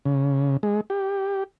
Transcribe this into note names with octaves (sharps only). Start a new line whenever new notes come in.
C#3
G#3
G4